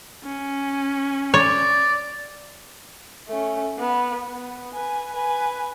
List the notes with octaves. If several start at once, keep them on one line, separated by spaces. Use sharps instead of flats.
C#4
C#5 D5
A3 C#4
B3
B3
B4 G#5
B4 G#5